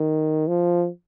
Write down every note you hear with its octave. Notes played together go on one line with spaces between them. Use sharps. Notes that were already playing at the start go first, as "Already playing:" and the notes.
Already playing: D#3
F3